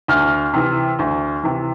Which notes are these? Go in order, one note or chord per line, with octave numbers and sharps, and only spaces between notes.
D2 F6
C3 E3
D2
C3 E3